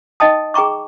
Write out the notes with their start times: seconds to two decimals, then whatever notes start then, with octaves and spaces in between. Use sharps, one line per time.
0.20 D#4 D#5 G5 A5 D#6
0.54 G#4 G5 A#5 C#6 D6